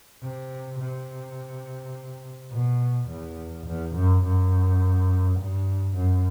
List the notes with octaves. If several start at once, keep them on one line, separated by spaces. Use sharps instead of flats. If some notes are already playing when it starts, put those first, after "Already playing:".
C3
C3
B2
E2
E2
F#2
F#2
G2
F#2